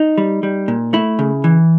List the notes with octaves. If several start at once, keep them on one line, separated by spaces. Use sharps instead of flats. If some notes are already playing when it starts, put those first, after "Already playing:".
Already playing: D#4
G3
G3
A#2
A3 E4
C#3
E3